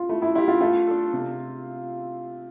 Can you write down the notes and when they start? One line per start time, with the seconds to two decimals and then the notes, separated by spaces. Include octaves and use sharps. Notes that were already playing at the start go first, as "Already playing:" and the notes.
Already playing: F4
0.09 A3 E4
0.22 E4
0.35 E4 F4 G4
0.48 F4
0.61 A3 F4
0.87 D4 A4
1.13 C3